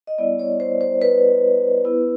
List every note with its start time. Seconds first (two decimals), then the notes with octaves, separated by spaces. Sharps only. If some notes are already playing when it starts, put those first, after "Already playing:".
0.07 D#5
0.18 G3 B3 E4 D5
0.39 C#5
0.60 C5
0.81 C5
1.02 B4
1.84 B3 E4